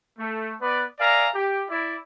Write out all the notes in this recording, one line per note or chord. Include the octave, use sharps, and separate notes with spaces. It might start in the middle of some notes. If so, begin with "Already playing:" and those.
A3
B3 B4 D5
A#4 D5 E5 F5 G#5 A#5
G4
E4 D5